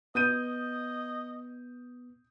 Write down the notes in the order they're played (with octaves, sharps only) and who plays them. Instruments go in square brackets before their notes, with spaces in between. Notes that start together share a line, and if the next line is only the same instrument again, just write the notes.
[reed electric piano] B3 [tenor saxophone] D#5 [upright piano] D#6 G6 D#7